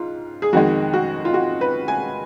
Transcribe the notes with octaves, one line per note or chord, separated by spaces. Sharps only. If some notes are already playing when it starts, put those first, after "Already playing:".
Already playing: G#2 F4
G#4
F2 D#3 G#3 F#4
F#4
F4
F#4
B4
G#5